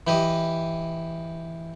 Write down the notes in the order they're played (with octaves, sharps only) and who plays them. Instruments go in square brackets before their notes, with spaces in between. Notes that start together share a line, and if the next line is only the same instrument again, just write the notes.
[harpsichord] E3 G4 D#5